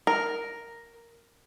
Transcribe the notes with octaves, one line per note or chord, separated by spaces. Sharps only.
A#4